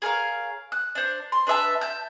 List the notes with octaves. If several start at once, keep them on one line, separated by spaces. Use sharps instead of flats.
G#4 A#4 C#5 F5
F#6
D4 C5
C6
D4 B4 E5 A5
A5 G6